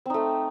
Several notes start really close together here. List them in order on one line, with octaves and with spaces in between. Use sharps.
C4 D#4 A3